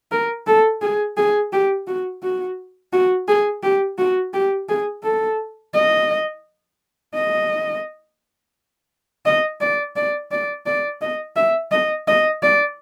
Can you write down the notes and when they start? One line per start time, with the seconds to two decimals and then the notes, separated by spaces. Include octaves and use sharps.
0.12 A#4
0.47 A4
0.81 G#4
1.17 G#4
1.52 G4
1.87 F#4
2.23 F#4
2.93 F#4
3.28 G#4
3.63 G4
3.98 F#4
4.34 G4
4.69 G#4
5.03 A4
5.74 D#5
7.15 D#5
9.26 D#5
9.61 D5
9.96 D5
10.32 D5
10.66 D5
11.01 D#5
11.36 E5
11.72 D#5
12.07 D#5
12.42 D5